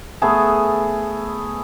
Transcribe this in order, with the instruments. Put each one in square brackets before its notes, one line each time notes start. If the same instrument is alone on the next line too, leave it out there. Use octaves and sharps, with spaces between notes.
[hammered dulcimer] A3 B3 G#4 A4